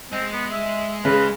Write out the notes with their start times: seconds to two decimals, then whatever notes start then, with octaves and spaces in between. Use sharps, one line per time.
0.12 G#3 C4
0.33 B3
0.51 E5
1.05 C#3 B4